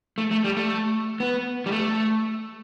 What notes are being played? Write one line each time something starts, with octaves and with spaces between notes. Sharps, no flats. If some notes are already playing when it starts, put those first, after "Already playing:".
A3
A3
G3
A3
B3
G3
A3